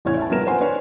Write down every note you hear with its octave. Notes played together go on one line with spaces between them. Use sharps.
A1 E2 A2 C#5 G#6
E4 A5
F3 G3 B3 A#4 E7
B4 C5 F#5 G#5 C6
D4 B4 C#5